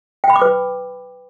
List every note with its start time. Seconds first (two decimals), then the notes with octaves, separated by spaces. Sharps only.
0.24 G5
0.30 B5
0.36 D6
0.42 B4